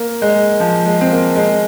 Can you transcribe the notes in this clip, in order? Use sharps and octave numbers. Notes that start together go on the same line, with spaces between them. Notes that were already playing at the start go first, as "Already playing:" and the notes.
Already playing: A#3
G#3
F3
G#3
C4
A#3
G#3